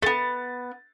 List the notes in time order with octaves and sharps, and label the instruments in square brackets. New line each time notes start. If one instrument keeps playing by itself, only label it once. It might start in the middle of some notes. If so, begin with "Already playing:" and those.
[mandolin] A3 B3 [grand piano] A6